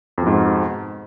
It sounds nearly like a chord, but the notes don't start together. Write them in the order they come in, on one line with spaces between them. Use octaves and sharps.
F2 B2 G#2